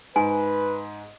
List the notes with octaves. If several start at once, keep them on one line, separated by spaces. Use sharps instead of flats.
G#2 B4 G#5